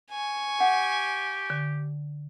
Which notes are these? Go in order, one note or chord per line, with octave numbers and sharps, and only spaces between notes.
G#5 C#6
G4 F#5
D3